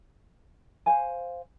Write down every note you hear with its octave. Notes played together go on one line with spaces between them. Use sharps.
C5 F5 G#5